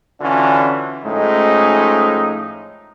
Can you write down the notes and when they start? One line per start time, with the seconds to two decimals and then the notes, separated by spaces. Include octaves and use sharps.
0.21 D3 E3 C#4 D4 F4 F#4
1.05 A2 F3 G#3 A3 C#4 D#4